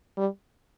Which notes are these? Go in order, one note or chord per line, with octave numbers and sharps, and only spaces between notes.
G3